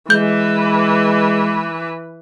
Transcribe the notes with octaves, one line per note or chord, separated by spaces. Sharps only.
E3 G#3 B4 G6